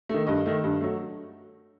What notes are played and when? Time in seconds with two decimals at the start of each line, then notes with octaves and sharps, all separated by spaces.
0.09 D#3 A3
0.27 G2 D#5
0.46 D#3 A3
0.64 G2
0.81 F#3 A3